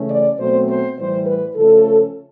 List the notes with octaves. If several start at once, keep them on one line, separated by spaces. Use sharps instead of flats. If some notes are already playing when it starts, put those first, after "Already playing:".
Already playing: C#3 E3 A3 C#4
D5
B2 F#3 A3 C4 C5
C5
A2 E3 G3 C5
B4
C#3 F3 A3 C#4 A4